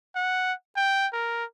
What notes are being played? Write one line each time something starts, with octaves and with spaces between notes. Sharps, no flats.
F#5
G5
A#4